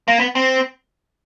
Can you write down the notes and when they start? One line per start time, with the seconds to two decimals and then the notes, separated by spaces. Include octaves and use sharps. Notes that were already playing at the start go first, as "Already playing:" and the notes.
0.08 A#3
0.20 B3
0.35 C4